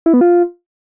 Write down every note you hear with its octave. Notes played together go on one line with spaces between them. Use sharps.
E4
B3
F4